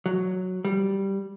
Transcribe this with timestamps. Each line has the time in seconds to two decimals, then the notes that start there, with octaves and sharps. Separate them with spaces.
0.06 F#3
0.65 G3